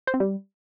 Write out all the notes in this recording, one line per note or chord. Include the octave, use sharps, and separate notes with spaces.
C5
C4
G3